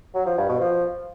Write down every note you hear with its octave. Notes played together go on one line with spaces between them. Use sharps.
F#3
F3
G2
B2
F3